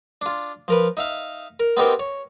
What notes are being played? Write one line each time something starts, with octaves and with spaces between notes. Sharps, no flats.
D4 F4
F3 A#4 B4
D#4 E5 F5
A#4
B3 C4 D#4 G4 A#4 C5
C#5